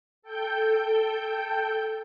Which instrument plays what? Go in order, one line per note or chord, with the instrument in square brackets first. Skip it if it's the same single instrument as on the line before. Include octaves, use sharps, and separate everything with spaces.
[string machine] A4 G5 G6